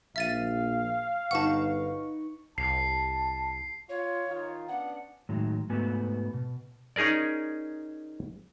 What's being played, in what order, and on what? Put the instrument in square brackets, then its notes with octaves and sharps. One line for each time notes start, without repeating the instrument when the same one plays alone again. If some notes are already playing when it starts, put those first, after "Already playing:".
[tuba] A#1 [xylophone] E5 A6 D#7 [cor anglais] F5
[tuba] G1 [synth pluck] D#4 B4 C#6 [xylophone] F#5 A5
[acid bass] C2 [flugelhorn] A5 [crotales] C7
[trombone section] F4 [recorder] C#5
[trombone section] D#3 F4
[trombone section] B3 C#4 D4 [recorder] F#5
[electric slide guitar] A2 D#3 F#3 G#3
G#2 A3 B3 F#4 B4 G#5
B2
[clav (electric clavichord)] C#4 D#4 G#4 A#4 D5